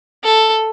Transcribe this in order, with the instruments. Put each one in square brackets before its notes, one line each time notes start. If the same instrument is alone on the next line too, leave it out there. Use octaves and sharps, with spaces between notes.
[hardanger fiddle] A4